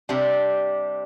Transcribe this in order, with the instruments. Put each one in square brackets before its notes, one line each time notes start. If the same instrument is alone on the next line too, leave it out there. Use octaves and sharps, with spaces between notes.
[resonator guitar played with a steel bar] C3 G3 D4